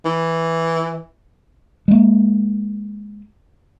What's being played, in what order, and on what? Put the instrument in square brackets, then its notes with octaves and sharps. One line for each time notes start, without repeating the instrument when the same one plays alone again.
[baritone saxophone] E3
[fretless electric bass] G#3 A#3